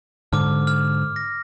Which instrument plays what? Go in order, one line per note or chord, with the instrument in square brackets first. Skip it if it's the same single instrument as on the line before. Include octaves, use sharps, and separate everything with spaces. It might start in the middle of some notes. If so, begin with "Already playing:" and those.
[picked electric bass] G#2 D3 [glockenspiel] D6 F6
[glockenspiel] F6
A#6